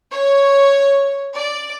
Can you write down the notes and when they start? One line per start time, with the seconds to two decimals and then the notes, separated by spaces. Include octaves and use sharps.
0.11 C#5
1.35 D5